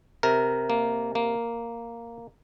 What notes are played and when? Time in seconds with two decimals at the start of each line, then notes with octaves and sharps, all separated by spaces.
0.23 C3 A#4
0.70 A#3
1.15 A#3